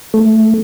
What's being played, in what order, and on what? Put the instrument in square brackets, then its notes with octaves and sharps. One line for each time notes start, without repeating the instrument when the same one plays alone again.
[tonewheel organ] A3